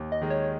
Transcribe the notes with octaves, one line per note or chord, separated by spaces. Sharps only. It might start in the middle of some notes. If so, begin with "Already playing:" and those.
Already playing: D#2
D#5
D#3 G#3
C#5